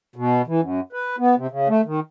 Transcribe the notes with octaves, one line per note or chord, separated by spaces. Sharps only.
B2
E3
F#2
B4
B3
C3
C#3
A3
D#3